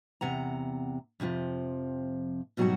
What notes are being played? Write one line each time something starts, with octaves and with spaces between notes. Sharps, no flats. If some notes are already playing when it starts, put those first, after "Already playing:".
E2 C3 F#5 A#5
F2 C3 D#3 F3
G#2 B2 F#3 G3 D#4 F#4